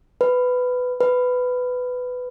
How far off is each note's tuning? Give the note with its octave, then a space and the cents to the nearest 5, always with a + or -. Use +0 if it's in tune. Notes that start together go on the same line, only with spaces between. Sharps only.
B4 +15
B4 +15